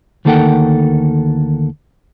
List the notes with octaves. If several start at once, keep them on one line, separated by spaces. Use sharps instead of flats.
D2 D#3 A#3 A4 F#5 G5